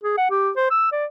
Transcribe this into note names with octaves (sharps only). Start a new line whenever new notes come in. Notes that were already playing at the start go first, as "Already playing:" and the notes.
G#4
F#5
G4
C5
E6
D5